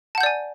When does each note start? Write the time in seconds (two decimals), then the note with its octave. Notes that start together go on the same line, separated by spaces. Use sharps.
0.15 A5
0.18 F#5
0.21 G6
0.23 D5
0.26 G#5